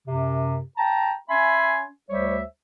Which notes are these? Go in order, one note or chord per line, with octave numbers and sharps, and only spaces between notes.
F#2 C3
G5 A5 A#5
C#4 E5 G#5 B5 C6
D2 G3 C5 C#5 E5